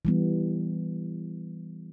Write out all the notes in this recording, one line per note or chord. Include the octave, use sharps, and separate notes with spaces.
E3 G3 B3